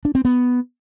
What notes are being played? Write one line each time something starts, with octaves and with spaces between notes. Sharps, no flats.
D4
C4
B3